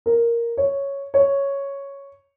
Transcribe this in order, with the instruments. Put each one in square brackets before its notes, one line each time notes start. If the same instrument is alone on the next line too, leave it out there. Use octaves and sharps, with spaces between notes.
[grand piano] A#4
C#5
C#5